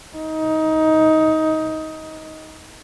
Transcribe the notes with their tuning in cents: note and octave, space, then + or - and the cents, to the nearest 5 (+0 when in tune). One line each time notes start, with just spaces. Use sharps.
D#4 +20